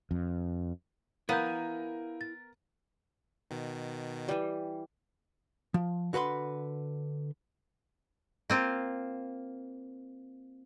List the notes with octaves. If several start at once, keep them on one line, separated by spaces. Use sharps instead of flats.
F2
B3 E4 A#4 F5 G#5 G6 D#7
A6
B2 D#3
E3 G3
F3
D3 F#4 B4 B5 C6
A#3 C4 F4